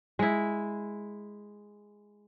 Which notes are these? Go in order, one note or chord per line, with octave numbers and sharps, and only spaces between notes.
G#3 E4